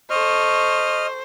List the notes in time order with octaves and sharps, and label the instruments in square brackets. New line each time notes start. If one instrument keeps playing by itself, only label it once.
[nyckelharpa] A4 C#6 [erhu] C5 [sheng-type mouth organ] D#5 F6